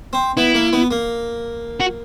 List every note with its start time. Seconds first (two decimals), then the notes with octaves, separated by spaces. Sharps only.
0.13 C4
0.37 B3 E4
0.55 A#3
0.73 B3
0.91 A#3
1.80 F#4